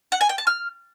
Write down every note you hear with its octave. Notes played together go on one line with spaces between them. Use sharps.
F#5
G#5
G5
A5
F6